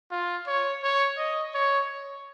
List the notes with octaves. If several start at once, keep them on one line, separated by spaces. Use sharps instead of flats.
F4
C#5
C#5
D#5
C#5